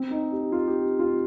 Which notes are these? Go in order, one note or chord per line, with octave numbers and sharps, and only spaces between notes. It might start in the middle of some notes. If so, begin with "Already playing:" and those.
Already playing: C4
D#4
G4
F4
G4
F4